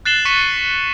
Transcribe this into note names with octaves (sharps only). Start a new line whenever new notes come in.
F#6 A6 C7 E7 F#7 G7
C#6 B6 C#7 D#7